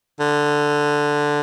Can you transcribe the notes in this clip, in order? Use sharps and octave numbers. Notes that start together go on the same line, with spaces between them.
D3